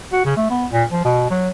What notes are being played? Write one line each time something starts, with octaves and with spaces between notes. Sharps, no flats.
F#4
C#3
A3
B3
A#2
F3
B2
F#3